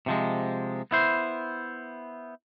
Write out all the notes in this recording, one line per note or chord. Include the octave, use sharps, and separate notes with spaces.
C3 F3 G#3
B3 E4 C5